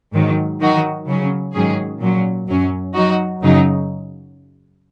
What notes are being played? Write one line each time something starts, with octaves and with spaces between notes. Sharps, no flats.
G#2 D#3 F#3
D#3 F#3 D#4 F#4
C#3 F#3 C#4
G#2 D#3 F#3 C#4 G#4
A#2 F#3 C#4
F#2 F#3 C#4
F#3 D#4 F#4
F#2 C#3 F#3 D#4